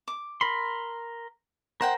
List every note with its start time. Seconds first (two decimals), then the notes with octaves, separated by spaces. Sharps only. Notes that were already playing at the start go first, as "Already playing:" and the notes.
0.08 D6
0.41 A#4 B5 C6
1.81 A#4 C5 F#5 G5